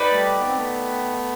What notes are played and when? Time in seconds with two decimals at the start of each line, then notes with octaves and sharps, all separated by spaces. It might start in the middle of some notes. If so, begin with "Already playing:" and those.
Already playing: D#4 G4 B4 D5
0.12 G3 A3
0.38 B3
0.47 C4
0.56 A3 B3